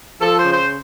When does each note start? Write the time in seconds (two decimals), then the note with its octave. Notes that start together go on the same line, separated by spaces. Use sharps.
0.20 F3 A4
0.37 C5
0.44 C#3
0.52 C5